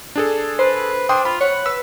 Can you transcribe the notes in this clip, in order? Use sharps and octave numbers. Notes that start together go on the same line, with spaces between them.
D4 G#4 A4
B4 C5
D4 G5 C6 D#6
F4 B5
C#5 F#5
B4 E6